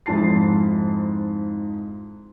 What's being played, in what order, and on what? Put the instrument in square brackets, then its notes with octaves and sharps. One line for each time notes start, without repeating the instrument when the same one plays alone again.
[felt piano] F2 G#2 E4 A5 C7